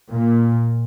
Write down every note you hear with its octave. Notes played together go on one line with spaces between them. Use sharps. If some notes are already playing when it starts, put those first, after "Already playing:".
A#2